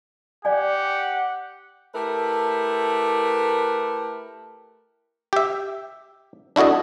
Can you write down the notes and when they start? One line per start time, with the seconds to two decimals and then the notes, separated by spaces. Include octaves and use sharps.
0.45 G4 D5 F#5 G#5
1.94 A3 E4 G4 A#4 B4
5.33 G4 E5
6.56 D4 E4 F#4 A4 D#5